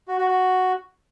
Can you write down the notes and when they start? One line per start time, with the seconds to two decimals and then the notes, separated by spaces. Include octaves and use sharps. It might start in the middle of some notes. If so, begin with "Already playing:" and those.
0.08 F#4
0.18 F#4
0.28 F#4